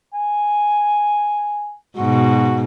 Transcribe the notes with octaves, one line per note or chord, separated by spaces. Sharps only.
G#5
G#2 B2 F#4